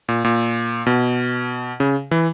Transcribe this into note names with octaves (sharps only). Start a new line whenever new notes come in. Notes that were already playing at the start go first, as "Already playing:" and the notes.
A#2
A#2
B2
C#3
E3